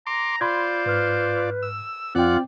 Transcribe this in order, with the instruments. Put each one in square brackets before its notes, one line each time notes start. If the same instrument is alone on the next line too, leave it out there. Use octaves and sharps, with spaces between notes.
[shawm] A#5 [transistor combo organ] C6 D6
[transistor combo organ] F4 D5 [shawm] C5 [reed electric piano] B5 C6 G#6
[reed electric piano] G#2 F6 [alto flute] B4
[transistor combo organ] E6
[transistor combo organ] F2 F#5 [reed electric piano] C4 G5 [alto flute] F4 [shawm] D5